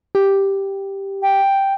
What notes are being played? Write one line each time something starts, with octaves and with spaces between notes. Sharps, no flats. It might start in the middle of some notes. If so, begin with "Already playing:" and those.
G4
G5